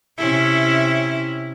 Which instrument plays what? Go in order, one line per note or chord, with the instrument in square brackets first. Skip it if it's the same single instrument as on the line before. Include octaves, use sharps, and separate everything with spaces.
[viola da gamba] C3 C#4 E4